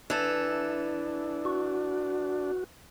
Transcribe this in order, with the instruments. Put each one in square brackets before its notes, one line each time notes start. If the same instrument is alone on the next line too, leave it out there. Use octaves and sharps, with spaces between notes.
[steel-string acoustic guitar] E3 A4 [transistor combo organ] D4
[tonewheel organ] F#4